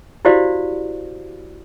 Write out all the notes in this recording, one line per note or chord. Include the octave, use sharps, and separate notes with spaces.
E4 F#4 G4 C5 D5 F5